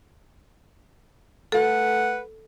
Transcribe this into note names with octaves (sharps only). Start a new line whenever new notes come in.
A3 A4 B4 F#5